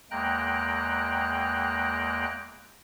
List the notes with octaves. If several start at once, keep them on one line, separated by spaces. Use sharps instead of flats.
E2 G#3 A#3 G5 A#5 F#6